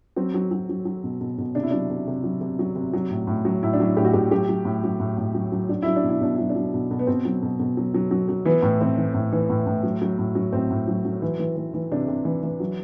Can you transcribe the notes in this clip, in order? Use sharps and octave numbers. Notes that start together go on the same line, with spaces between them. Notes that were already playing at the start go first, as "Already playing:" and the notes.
F#3 C4
F#3
F#3
F#3
F#3
B2
B2
B2
C3 D4
E4
F#3 D4
C3
C3
F#3
C3
F#3
C3
F#3
A2
A2
F#3
A2 E4
D4
F#3 E4
A2 G4
F#4
A2 G4
F#3 G4
F#3
A2
F#3
A2
A2
F#3
F#3
F#3 D4
F#3 E4
D4
B2
E4
B2 D4
F#3 E4
D4
F#3
B2
B2
B3
B2 C4
F#3
B2
B2
F#3
F#3
F#3
F#3
E3 B3
A2
E3 C4
E3
A2
E3
A2
A2
F#3
F#3
A2
F#3
A2 C4
A2
F#3
F#3
E3
E3
E3
E3
C3 D4
C3
E3
E3
F#3